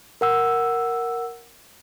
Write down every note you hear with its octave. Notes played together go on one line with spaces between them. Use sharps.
A#4 F#5 E6